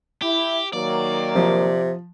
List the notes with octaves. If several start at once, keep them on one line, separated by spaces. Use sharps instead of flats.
E4 G4
D#3 F#3 A#3 D5
C3 F3